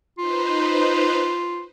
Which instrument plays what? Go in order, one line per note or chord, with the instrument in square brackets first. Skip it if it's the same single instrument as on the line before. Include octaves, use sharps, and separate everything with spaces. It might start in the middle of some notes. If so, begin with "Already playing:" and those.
[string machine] D#4 B4 C5 [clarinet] F4